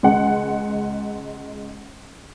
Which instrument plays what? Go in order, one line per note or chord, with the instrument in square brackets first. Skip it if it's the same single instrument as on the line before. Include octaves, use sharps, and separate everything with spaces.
[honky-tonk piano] C#2 G#3 F#5